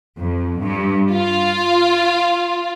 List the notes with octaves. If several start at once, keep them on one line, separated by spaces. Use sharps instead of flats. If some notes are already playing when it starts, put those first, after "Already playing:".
F2
G2
F4